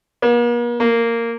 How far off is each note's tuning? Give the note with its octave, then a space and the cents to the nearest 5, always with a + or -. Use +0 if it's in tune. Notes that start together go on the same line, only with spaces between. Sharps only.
A#3 +45
A#3 -10